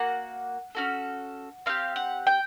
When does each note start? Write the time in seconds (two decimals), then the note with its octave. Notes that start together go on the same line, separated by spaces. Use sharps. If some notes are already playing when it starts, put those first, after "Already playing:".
Already playing: A#3 F#4 F#5
0.75 C#4 F#4 A4
1.66 C4 D#4 G4 F5
1.96 F#5
2.27 G5